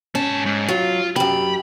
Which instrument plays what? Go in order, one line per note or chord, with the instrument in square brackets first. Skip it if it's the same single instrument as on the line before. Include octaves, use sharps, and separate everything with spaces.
[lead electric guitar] G#2 A5 [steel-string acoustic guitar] C#4
[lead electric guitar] G#2
[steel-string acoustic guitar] F#3 [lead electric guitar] F4
[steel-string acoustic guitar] F#2 G4 [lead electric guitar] B5